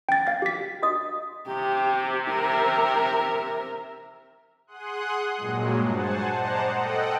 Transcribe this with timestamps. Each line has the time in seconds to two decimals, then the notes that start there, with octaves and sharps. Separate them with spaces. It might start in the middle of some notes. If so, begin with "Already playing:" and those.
0.09 G5 A6
0.27 F5 A6
0.42 G4 B6
0.82 F#4 D#5 D#6
1.47 C3 G4
2.29 A#4 E5
4.67 G#4 F#5 C6 D#6 F#6
5.37 G2 A#2 F#3 G#3
5.87 C5 F#5 G#5 A5
6.37 C5 D5 D#5 F#5 A5 A#5
6.72 A4 D#5 F#5 G5